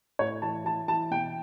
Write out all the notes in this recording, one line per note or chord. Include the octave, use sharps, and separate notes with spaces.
A2 C#5
E3 A5
E3 A5
E3 A5
B2 G5